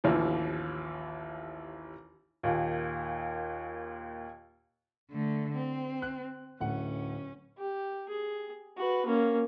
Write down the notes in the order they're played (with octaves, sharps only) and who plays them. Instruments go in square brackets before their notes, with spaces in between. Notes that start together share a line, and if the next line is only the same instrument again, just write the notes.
[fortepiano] A1 D#2 E3 F3
[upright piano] D#2 A#2
[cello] D3 A3
C4
[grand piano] F#6
[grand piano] D1 A3 F#5 [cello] C#4
[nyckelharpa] G4
G#4
F#4 B4
A#3 C#4